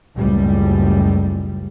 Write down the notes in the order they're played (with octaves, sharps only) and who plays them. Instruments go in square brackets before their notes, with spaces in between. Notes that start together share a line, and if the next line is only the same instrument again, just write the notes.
[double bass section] F#1 C#2 A2 G3